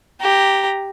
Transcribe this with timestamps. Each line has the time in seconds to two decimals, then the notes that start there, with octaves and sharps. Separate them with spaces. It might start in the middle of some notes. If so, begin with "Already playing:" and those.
0.21 G4 A#5